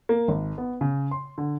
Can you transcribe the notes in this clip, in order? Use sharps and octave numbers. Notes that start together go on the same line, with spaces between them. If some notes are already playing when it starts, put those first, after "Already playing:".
A#3
G#1
B3
C#3
C6
D3